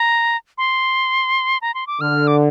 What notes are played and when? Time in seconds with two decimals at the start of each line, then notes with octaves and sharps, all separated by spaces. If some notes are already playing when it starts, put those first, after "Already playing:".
Already playing: A#5
0.58 C6
1.62 A#5
1.74 C6
1.87 D6
2.00 D3 F6
2.27 D6